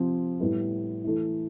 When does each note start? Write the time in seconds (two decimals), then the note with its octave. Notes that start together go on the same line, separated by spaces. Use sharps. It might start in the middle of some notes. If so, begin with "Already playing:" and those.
Already playing: C3 F3 C4
0.40 A2 G3 B3 E4
1.04 E3 A3 E4